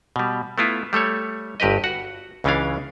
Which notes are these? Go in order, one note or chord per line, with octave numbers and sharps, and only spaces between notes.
B2 G3
A3 B3 E4 F4
G3 A3 A4 C#5
G1 G2 G4 B4 D#5
F#4 F#5
C#2 C#3 E3 C#4 D4 F5